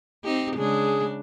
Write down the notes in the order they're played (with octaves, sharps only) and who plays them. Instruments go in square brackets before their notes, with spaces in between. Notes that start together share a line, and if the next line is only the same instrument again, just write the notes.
[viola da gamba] C4 D#4 G4
[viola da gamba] C#3 G#3 D4 [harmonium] G#4